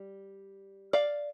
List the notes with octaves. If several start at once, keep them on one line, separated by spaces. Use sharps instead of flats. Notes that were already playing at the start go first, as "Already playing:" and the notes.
Already playing: G3
D5 F5